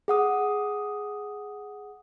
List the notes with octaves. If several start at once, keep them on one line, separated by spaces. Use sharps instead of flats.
G#4 F#5 D#6